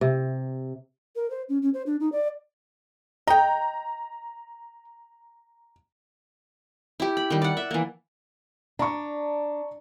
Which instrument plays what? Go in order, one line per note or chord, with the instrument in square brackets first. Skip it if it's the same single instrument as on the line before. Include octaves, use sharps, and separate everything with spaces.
[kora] C3
[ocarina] A#4
C5
C#4
C#4
C5
D4
D#4
D5
[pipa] D#5 G5 [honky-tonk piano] A#5
[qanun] E4 G4
B5
D#3 G3
D5 F#5
E5
E3 A#3
[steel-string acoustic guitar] D4 [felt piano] A#5 C#6